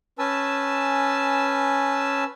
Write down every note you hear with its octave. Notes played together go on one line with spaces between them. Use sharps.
C#4 B4 G#5 A5 E6